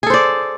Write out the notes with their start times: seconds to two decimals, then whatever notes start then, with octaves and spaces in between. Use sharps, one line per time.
0.03 G#4
0.06 A4
0.10 C5
0.14 D5